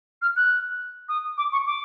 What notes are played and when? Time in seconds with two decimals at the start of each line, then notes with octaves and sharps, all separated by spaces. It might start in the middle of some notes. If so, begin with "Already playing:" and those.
0.22 F6
0.36 F#6
1.09 D#6
1.38 D6
1.52 C#6
1.66 D6